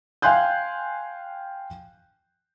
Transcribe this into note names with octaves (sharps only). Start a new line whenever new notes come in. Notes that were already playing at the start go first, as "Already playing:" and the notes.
F5 G5 G#5 C6 F#6 G6